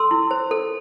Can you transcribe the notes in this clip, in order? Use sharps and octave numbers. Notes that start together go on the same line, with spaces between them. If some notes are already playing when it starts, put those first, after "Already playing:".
Already playing: A4 C6 E6
E4
C5
A4